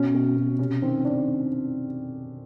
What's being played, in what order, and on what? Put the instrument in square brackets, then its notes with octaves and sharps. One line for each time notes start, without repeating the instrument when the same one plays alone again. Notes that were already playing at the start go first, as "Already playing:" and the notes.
Already playing: [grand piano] B2 C#4
B2
B2
C3 C#4
D#3 C4
D#3 D4